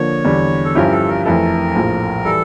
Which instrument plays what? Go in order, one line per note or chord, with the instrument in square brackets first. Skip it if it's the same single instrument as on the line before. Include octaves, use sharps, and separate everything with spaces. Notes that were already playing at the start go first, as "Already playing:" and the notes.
Already playing: [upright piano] D3 F3 A#3 [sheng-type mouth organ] C#5
[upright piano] E2 D3 G3
[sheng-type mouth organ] A4
[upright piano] G2 F3 C#4 E4 G4 [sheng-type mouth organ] A#4
[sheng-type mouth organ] A4
A#4
[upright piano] F2 E3 A3 E4 A4 [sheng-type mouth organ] A#4
[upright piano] A#1 A2 F3
[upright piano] E3 G3 [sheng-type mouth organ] A4